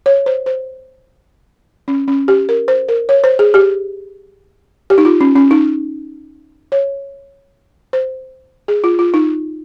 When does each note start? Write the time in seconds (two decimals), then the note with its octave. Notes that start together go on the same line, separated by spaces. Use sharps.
0.06 C#5
0.26 C5
0.46 C5
1.88 C#4
2.08 C#4
2.28 G4
2.49 A#4
2.68 C5
2.89 A#4
3.09 C#5
3.24 C5
3.39 G#4
3.54 G4
4.90 G4
4.98 D#4
5.05 F4
5.21 C#4
5.35 C#4
5.51 D#4
6.72 C#5
7.93 C5
8.68 G#4
8.84 F4
8.99 F4
9.14 D#4